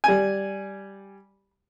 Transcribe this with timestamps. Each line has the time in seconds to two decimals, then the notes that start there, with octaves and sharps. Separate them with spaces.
0.04 G3 G#5